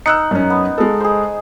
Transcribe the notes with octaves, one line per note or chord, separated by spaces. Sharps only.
D#4 E6 F#6 C#7
F#2 C#4
B3
G#3 A4
G#4 C5